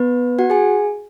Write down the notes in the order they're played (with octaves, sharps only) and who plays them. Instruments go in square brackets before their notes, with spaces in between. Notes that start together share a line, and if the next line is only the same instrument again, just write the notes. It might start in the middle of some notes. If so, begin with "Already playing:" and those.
Already playing: [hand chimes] B3 B4
F#4 F#5
G#4 G#5